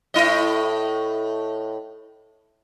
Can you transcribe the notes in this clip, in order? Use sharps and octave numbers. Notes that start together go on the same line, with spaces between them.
A2 E4 D#5